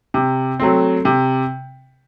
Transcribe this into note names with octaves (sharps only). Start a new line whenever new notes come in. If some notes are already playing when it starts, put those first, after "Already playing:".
C3
F#3 A3 C4
C3